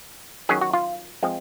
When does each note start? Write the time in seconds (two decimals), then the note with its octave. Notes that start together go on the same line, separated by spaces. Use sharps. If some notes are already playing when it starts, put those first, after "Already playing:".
0.49 D#3 F#3 C#4 G#4
0.61 F#4
0.73 F4
1.23 F3 G#3 C4